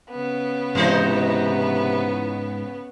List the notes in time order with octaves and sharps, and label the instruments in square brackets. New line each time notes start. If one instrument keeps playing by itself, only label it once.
[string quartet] C#3 B3
[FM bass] G#2 [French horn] C3 [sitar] E3 D#4 C5